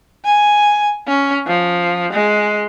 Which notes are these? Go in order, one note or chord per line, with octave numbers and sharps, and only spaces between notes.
G#5
C#4
F3
G#3